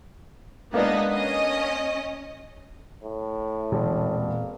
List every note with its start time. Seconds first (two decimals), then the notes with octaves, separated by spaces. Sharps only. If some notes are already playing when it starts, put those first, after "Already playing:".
0.74 G#3 A#3 B3 D4 D#4
1.12 C#4 D#5
3.03 A2
3.72 E1 A#2 E3 C4
4.19 A#3